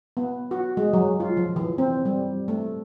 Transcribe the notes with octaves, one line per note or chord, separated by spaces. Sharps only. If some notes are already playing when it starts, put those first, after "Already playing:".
B3
F#4
G#3
F#3
F4
F3
E3
C4
G3
A3